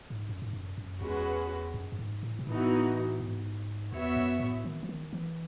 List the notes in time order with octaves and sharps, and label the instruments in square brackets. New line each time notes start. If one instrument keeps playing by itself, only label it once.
[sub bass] G#2
F#2
G#2
F#2
F#2
[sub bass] E2 [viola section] G#3 C#4 F#4 B4
[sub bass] F#2
F#2
G#2
A2
B2
[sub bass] A2 [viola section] E3 B3 D#4 F#4
[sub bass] G#2
[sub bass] E2 [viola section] B3 F#4 C#5 E5
[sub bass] F#2
A2
D#3
E3
D#3
E3